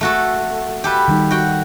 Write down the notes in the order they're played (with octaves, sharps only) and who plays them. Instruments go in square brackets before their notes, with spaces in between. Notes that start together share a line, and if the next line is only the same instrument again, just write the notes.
[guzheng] A3 F#4 A4
G4 A4 B4
[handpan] D#3 G3 D#4
[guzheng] F#4 G5